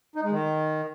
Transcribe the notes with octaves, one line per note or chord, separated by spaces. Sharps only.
D#4
G#3
D#3